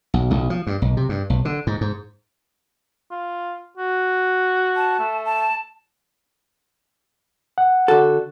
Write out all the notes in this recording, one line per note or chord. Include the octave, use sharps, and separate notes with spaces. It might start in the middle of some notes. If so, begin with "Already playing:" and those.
B1
B1
F3
G2
B1
C3
G2
B1
D3
G#2
G#2
F4
F#4
A5
A3
A5
F#5
D3 F#4 A4